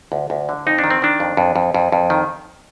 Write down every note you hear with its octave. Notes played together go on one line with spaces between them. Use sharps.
D2
D2
D3
F2 D#4
D4
D#3
C4
D#3 D4
F2
F2
F2
F2
F2
D#3